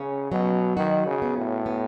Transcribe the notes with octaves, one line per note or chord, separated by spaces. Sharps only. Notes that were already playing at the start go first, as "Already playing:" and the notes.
Already playing: C#3 C#4
B2 F#3
D#3 F#4
C#3
B3
A2
B3